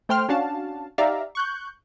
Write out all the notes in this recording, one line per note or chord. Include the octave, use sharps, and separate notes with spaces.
A3 C5 G5 C6 F6
C#4 D4 F#4 F5 A5
D#4 G4 D5 E5 F5 A#5
C#6 F#6 G6